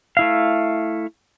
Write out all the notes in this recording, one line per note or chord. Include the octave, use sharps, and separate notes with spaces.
A3 E4 F5